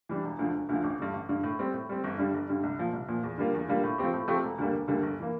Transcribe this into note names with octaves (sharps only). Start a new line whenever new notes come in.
E3 G3 D4
E1
D2 D3 F3
E1
D2 D3 F3
A1
G2 D3
A1
G2 D3
A2
G3 C4
A2
G3 C4
G1
G2 D3 G3
G1
G2 D3 G3
C2
A#2 F3
C2
A#2 F3
E2
D3 G3 A#3 F4
E2
D3 G3 A#3 F4
A2
F3 A3 C4 G4
A2
F3 A3 C4 G4
E1
D2 D3 G3 A#3
E1
D2 D3 G3 A#3
G1
E3 A#3